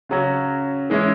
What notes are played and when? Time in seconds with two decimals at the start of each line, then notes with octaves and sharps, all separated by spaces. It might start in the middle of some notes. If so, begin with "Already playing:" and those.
0.09 C#3 F#3 C#4 F#4
0.90 E3 G#3 C#4 E4